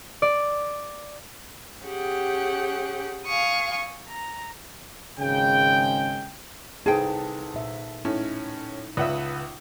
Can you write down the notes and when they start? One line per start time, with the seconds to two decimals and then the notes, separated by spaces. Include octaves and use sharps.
0.22 D5
1.84 C#4 G4 G#4 F#5 G5
3.24 F5 G#5 C#6 D#6
4.07 A#5
5.20 G#1 C#3 G#3 G5
6.86 C2 D#4 G#4 A4 B4 G5 A5
7.54 A#2 E5
8.05 A2 C#4 D#4
8.97 C#2 B4 E5 F#5 D#6